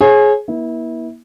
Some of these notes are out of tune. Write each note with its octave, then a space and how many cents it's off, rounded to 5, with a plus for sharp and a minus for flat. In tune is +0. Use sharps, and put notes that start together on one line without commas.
G#4 +15 C#5 -35
A#3 +45 E4 -25